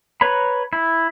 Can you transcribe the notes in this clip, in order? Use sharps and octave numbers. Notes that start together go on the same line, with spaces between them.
B4 C#5 A#5 B5
E4